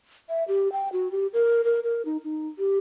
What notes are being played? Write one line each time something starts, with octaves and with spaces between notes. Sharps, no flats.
E5
G4
G5
F#4
G4
A#4
A#4
A#4
D#4
D#4
G4